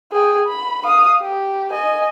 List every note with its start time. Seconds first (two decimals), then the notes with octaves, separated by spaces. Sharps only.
0.12 G#4 G5
0.47 B5
0.84 F5 D#6
1.22 G4
1.71 D#5 G#5